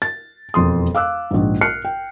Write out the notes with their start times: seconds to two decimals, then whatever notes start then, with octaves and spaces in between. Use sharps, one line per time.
0.02 A6
0.54 E1 F2 C6 D#6
0.95 F5 D6 E6 F#6
1.31 A#1 G#2
1.61 F6 F#6 C7 C#7
1.85 G5